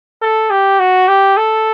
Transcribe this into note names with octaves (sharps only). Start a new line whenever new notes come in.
A4
G4
F#4
G4
A4